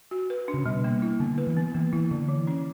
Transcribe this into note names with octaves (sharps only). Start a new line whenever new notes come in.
F#4
B4
D4
C#3
B2 G3
A#3
E4
D3 B3
B4
E3
B3
E3 A#3
E3 E4
D3 E4
E3
C#4